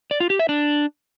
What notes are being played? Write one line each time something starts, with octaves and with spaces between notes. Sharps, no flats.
D5
F4
G4
E5
D4